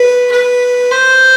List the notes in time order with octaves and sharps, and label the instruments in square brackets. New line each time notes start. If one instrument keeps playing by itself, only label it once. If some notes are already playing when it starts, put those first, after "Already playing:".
Already playing: [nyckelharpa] B4
B4
C5